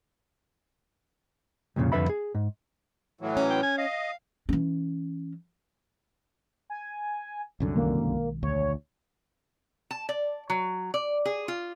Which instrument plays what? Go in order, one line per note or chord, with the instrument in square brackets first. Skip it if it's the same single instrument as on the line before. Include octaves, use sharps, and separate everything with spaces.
[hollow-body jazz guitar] C2 F2 A#2 C#3
C2 F2 D3 B4 E5 B5
G#4
G#2
[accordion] A2 E3 F#3
[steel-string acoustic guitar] C#4
[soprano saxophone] G5
G#5
[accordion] D#5 [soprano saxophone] F5
[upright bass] E3 C#4
[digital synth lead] G#5
[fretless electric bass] C2 F#2 D3
[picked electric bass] B1 D#3 G#3 [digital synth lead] A#3
[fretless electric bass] D2 [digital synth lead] C#5
[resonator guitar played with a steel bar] A5
D5
F#3
D5
G#4
F4